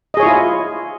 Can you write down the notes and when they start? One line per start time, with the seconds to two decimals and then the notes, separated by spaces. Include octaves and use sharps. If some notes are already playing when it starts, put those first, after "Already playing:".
0.14 D#5
0.17 G#4
0.20 C#5
0.23 E4
0.26 F4